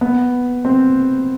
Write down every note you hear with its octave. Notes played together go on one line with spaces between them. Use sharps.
B3
C4